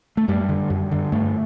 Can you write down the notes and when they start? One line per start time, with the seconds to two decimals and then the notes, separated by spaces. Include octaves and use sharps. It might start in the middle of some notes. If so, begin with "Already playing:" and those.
0.17 A3
0.28 F#2 G3
0.49 D3
0.70 F#2
0.91 D3
1.12 G2 A3